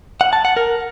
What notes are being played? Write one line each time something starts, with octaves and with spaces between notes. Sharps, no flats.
F#5
A5
F#5
A#4